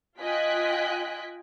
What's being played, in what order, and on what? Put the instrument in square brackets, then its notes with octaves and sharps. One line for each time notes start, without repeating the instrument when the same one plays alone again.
[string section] F4 D#5 G5 G#5 F#6 B6